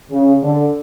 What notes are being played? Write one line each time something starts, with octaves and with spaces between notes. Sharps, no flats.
C#3
D3